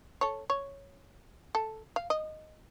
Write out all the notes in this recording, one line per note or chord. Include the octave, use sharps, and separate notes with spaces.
A4 C#5
C#5
A4
F5
D#5